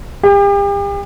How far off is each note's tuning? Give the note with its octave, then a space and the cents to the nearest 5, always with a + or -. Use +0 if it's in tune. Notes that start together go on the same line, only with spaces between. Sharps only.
G4 +40